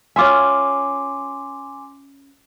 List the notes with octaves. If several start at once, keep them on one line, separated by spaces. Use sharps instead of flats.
C#4 F4 E5 G#5 C6 D6